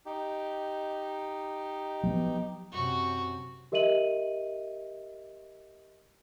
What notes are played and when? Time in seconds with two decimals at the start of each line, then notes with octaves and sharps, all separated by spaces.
0.06 D#4 G4
2.03 F3 F#3 B3
2.72 F#2 C3 F#4
3.72 G4 A#4 D#5 E5 D#7 F#7